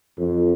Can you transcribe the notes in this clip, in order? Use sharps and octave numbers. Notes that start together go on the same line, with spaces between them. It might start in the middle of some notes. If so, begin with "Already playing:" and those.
F2